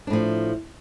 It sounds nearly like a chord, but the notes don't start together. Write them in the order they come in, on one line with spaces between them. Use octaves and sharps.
D4 A2 F3